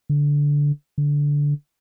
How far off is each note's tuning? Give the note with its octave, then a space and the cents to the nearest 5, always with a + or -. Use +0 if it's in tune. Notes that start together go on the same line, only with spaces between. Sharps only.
D3 -15
D3 -15